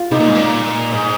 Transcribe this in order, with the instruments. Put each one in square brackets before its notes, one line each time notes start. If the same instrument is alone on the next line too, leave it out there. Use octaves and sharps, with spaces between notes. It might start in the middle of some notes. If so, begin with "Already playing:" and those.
Already playing: [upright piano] F4
[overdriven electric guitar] C3 [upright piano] D#4
[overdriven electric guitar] A#2
G#2
A#2
G#2